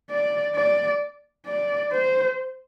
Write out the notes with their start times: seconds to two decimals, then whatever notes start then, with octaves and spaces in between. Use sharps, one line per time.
0.11 D5
0.55 D5
1.47 D5
1.92 C5